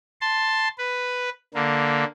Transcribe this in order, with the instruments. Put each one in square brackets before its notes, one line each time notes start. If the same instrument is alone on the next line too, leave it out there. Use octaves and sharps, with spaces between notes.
[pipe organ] A5 C6
B4
D3 A#3